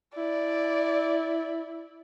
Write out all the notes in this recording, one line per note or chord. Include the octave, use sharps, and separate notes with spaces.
E4 D5